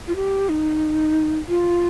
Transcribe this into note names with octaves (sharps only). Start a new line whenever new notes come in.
F4
G4
D#4
F4